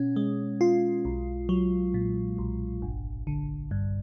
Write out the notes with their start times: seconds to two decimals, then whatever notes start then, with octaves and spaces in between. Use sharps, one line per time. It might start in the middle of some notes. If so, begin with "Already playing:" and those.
Already playing: B2 C#4
0.16 G#3
0.61 F4
1.05 B1
1.49 F#3
1.94 A#2
2.38 B1
2.82 G1
3.27 D3
3.71 G2